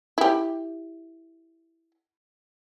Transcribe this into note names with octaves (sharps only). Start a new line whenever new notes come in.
E4 G4